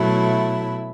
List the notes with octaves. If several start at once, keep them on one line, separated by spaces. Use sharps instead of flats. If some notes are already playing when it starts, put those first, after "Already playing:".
Already playing: B2 F#3 A3 E4